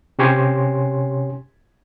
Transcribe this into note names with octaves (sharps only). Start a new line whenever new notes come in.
C3 C#4 G4 C#5 G#5 C6